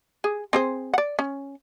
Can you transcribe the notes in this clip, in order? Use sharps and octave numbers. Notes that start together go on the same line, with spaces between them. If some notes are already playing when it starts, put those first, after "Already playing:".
G#4
C4 G#4 C5
D5 F#5
C#4